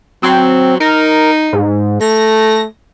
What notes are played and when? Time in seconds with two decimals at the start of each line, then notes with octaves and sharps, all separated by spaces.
0.23 F#3 C4
0.80 D#4 A#4
1.53 G#2
2.01 A3 A#6